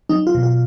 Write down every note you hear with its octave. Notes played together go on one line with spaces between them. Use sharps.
F#3 D#4
F4
B2
F4